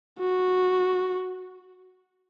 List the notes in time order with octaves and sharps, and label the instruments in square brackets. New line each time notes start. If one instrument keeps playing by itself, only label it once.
[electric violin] F#4